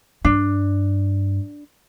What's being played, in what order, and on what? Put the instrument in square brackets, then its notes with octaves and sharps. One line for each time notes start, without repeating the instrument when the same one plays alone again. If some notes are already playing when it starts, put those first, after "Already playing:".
[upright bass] G2 [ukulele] D4